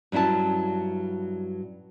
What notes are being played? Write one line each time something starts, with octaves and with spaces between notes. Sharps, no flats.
G2 F#3 C#4 E4 A5